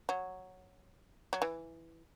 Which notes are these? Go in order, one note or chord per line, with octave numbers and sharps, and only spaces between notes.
F#3
F#3
E3